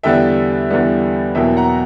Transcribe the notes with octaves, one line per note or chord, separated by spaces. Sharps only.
E2 D3 G3 B3 D4 E5 G5
E2 D3 G3 B3 D4
E2 B2 F#3 A#3 E5 G5
F#5 A#5